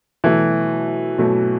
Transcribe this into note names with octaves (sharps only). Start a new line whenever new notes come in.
B2 E3 F#3 A3
B2 F#3 A3